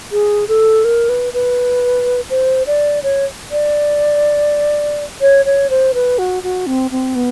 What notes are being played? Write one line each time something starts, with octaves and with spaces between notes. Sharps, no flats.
G#4
A4
A#4
B4
B4
C5
D5
C#5
D5
C#5
C#5
C5
B4
F#4
F#4
C4
C4
B3